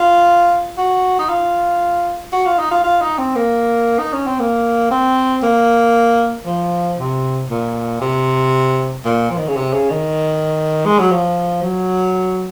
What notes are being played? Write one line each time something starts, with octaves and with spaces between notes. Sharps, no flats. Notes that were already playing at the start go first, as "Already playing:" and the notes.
Already playing: F4
F#4
D#4
F4
F#4
F4
D#4
F4
F4
D#4
C4
A#3
D#4
C#4
C4
A#3
C4
A#3
F3
C3
A#2
C3
A#2
F3
D#3
C#3
C3
C#3
D#3
G#3
F#3
F3
F#3